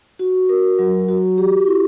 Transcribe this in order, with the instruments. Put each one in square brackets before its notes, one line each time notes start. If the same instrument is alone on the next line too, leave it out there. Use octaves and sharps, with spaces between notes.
[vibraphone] F#4
A#4
F#3
F#4
G4
E4